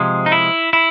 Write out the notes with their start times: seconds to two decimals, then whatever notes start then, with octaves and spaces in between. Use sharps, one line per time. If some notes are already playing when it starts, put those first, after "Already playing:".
Already playing: C3 F3 G#3
0.26 D#4
0.32 E4
0.73 E4